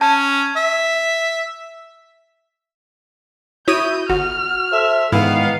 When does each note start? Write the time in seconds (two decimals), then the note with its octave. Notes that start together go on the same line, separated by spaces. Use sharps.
0.01 C#4 A5
0.56 E5
3.68 E4 F#4 C#5 D#6 G6 D#7
4.10 G1 F#4 F6
4.72 A4 C5 E5
5.12 G#2 D#3 E3 B3 E4 F5